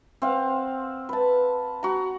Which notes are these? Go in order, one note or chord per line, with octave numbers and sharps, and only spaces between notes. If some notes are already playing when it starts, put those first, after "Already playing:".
C4 F5 F#5
B4 A5
F#4 A#5